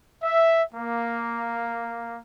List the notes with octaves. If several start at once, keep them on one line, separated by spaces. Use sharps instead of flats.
E5
A#3